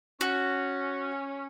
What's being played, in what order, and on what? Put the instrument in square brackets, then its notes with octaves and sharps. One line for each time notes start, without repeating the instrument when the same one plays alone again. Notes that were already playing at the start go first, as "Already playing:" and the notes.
[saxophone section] C#4 [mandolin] F#4